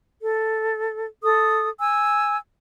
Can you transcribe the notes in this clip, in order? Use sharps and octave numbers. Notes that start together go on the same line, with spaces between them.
A4
A4 D#6
G#5 E6